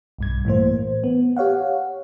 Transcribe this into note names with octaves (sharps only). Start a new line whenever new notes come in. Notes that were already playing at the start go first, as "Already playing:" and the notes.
B1 G2 G#6
A2 E3 A#3 C5
B3
G4 C#5 F5 F#5